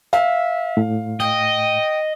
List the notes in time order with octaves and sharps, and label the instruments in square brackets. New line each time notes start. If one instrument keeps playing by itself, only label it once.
[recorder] E5 [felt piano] F5
[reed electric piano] A2
[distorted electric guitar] D#5 [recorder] G5